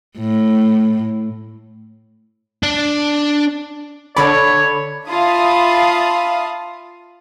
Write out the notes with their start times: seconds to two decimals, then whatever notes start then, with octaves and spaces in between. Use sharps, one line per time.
0.18 A2
2.63 D4 D5
4.17 D3 A4 C#5 D5 B5
5.09 F4 E5 F5 A5 B5 D#6